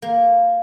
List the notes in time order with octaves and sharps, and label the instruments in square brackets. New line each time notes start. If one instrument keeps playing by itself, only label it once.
[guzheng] A#3